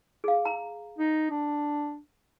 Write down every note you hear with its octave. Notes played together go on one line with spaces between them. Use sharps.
G#4 F5
A#5
D#4
D4